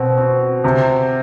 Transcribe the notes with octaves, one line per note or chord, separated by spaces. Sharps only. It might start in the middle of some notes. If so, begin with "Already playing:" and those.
Already playing: B2 C4
C4
C3